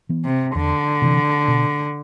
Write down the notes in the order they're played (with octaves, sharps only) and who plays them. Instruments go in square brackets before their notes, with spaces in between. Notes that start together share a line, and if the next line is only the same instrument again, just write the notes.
[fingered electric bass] E3 B3
[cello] C3
[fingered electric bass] E2 [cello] D3
[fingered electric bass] C3 E3
B2